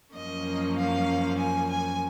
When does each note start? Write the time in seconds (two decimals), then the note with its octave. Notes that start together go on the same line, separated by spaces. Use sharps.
0.14 F#2 F3 A#3 C#4 D#5
0.76 F5
1.38 G#5
1.69 G#5